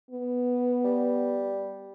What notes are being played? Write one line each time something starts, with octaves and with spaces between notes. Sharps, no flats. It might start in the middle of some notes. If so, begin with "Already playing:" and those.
B3
G3